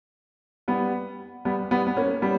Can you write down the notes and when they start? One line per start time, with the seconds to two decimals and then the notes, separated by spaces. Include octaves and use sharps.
0.68 G3 B3
1.45 G3 B3
1.71 G3 B3
1.87 B3
1.97 A#3 C#4
2.22 G3 B3